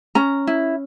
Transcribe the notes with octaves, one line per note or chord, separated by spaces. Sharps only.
C#4 A#5
E4